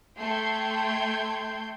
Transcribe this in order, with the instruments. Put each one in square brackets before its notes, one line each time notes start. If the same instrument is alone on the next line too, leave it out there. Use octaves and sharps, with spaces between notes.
[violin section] A3 A4 G5 C6 G6 G#6